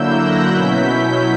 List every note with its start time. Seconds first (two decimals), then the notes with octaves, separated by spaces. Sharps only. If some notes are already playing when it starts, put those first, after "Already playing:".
Already playing: D3 F#3 A#3 E4 E6 G6
0.15 F#6 A#6
0.49 B2 F#3 C#4 E4 G6 B6